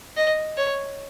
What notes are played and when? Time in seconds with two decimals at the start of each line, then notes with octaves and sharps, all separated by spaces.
0.17 D#5
0.57 C#5